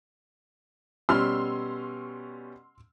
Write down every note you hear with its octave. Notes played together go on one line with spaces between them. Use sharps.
B2 G3 C#4 C6 E6 F6